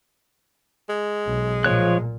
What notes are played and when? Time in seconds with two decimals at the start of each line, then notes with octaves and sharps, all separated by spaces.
0.89 G#3
1.26 B1
1.64 A#2 F3 C#5 F#6